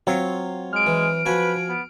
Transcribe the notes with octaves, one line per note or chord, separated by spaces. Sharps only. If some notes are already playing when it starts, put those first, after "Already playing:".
F#3 C4 F4 C#5
G#3 F6 D7
E3
F3 F#4 B4 G#5
B3